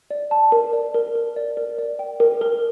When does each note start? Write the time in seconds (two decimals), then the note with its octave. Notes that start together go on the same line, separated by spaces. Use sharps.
0.10 D5
0.31 A5
0.52 A#4
0.73 D5
0.94 A#4
1.15 A#4
1.36 D5
1.57 A#4
1.78 D5
1.99 G5
2.20 A#4
2.41 A#4